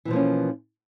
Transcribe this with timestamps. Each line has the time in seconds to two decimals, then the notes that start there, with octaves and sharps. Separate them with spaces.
0.05 E3
0.08 B2
0.10 F3
0.13 A#3
0.16 C#4